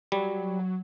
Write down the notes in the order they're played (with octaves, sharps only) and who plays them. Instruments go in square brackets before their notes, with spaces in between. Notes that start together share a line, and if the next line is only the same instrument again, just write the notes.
[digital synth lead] F#3 [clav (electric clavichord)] G3